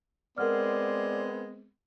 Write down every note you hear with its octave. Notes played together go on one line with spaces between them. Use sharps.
G#3 B3 C4 A#4 D5 F#5 F6